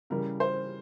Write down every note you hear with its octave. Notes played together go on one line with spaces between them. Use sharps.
C#3 E3 G3 A#4
C5